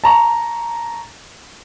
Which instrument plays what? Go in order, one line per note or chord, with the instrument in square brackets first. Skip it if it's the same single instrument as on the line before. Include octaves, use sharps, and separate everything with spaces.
[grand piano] A5 A#5 C#6